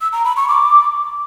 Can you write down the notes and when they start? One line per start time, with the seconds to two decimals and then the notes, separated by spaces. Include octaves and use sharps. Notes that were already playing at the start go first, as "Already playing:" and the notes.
0.01 E6
0.13 A#5
0.25 B5
0.37 C#6
0.48 D6